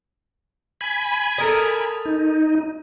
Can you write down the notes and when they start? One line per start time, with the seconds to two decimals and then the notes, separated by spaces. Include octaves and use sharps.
0.81 G#5 B5
1.38 A4 A#4 D#5
2.05 D#4